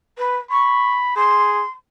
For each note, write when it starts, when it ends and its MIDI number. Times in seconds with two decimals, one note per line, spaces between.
0.18 0.38 71
0.51 1.13 83
0.51 0.93 85
1.16 1.64 68
1.16 1.70 84